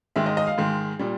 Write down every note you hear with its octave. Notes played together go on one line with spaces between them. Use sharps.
G#2 D#3 G#3 E5
D#5
D#5
F5
G#2 D#3 G#3
A#2 G3